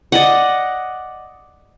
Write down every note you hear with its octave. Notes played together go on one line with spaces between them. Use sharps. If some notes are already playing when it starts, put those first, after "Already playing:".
D5 D#5 F#5